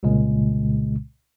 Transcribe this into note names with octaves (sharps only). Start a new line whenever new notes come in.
C2 A#2 C#3 G#3